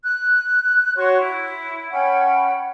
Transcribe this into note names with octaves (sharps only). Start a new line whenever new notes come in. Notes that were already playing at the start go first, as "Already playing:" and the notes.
F#6
F#4 C#5 C6 C#6
E4
C#4 F#5 G5 B5